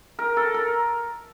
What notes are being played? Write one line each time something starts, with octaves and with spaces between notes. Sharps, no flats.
A#4
A4
A#4